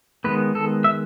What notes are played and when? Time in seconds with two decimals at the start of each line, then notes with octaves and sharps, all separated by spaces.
0.24 D#3 G#3 B3 B4
0.55 A4
0.84 E5